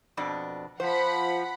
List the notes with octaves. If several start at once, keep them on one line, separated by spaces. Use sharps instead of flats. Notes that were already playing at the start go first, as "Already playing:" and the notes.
F2 B2 D4
F3 C5 F#5 B5